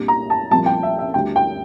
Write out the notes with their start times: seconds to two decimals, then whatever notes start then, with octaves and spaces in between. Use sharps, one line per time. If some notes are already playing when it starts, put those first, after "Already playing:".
Already playing: C2 A#2 G3 D4
0.08 A#5
0.30 A5
0.51 C2 A#2 F3 A#3 A5
0.66 G5
0.83 E5
0.99 E5
1.14 D2 D3 G3 G5
1.36 G5